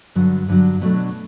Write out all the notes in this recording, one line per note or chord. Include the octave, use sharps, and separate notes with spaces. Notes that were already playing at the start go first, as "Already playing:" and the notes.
G2 D3 F#3
G2 D3 F#3
B2 F#3 A3 D4